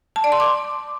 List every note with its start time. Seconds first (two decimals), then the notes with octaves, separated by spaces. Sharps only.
0.16 A5
0.24 D5
0.32 C6
0.40 D6